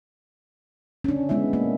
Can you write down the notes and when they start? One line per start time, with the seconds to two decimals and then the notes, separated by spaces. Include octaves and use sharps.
1.04 C#4 D4
1.29 G#3 B3 E4 E5
1.53 A#3